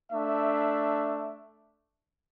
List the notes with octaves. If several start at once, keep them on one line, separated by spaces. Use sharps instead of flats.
A3 D4 E5